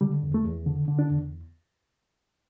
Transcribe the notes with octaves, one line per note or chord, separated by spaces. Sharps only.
D3 G3
E2
A3
E2
D3
D3
D4
E2